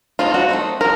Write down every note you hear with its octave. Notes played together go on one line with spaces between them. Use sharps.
A3 C4 D#4 F4
F#4
A3 C4 D#4
F3 A#4